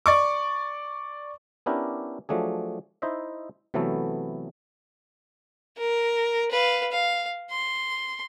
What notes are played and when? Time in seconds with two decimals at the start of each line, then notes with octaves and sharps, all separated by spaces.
0.06 D5 C#6 D6
1.66 B3 C#4 D4 E4 G4 A#4
2.29 F3 F#3 A3 D4 G#4
3.02 D#4 E4 C5 D#5 E5
3.74 C3 E3 F#3 A3 B3 A4
5.78 A#4
6.51 B4 F5
6.91 F5
7.51 C6